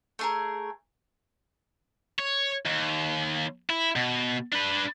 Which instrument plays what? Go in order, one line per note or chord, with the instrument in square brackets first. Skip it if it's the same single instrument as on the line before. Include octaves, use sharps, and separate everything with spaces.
[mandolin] A3 G#4 A#4
[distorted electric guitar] C#5
D#2
E4
B2
D4 B4